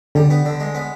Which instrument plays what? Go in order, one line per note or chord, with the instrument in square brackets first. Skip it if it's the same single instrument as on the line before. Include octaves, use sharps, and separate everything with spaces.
[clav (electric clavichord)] D3 [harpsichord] G3
[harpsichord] B3
D3
G#3
B3